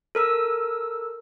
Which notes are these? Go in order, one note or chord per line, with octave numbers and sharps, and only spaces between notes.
A4 A#4 E6